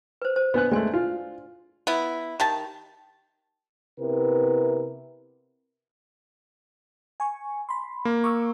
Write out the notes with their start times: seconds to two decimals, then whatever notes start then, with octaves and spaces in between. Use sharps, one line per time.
0.22 B4 C5
0.36 C5
0.54 B3 D4 D5 F#6
0.71 G#3 A3 D5 G#5 C6
0.94 F4
1.87 B3 E4
2.40 D#3 G4 A5
4.00 C3 B3 E4 A#4 B4
7.20 G#5 C#6
7.69 B5 C6
8.05 A#3
8.24 C#6 D6 E6